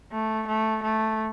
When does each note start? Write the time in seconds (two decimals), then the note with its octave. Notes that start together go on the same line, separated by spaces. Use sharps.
0.12 A3
0.47 A3
0.83 A3